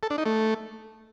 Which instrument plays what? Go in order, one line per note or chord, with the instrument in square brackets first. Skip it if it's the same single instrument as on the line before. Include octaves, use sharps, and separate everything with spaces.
[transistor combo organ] A4
D4
D#4
A3